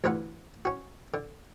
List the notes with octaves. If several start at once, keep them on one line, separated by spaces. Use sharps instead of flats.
D2 G2 E3 F4 B4 F#5
C#4 F#4
D3